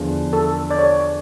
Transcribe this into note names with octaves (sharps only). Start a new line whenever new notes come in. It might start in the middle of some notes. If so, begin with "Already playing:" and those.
Already playing: E2 D3 F3
A4
D5
C#5